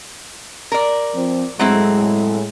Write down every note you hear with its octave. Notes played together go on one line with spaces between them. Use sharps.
A#4 D5
F3 C4
A2 F#3 G#3 C4 E4